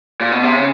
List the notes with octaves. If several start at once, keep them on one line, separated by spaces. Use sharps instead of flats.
A#2
B2
C3
C#3